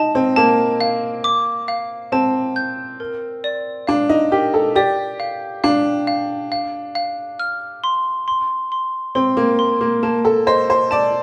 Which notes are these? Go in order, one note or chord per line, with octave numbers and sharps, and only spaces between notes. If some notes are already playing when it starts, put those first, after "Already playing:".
Already playing: D#4 A5
C4
A#3 A5
F5
D6
F5
C4 A5
G6
A#4
D5
D4 F5
D#4
G4 A#4
A4
G4 D5
F5
D4 F5
F5
F5
F5
F6
C6
C6
C6
C4 C6
A#3
C6
A#3
A#3 A5
A4
C5 D#5
C5
D5 A5